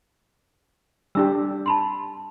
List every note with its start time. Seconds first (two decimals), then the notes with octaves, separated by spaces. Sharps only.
1.15 G3 D4 G4 E6
1.66 A5 B5 C6